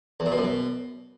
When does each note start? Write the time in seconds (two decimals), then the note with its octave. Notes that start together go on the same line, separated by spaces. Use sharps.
0.20 E2
0.26 A#2
0.32 B2
0.38 F#2
0.44 B2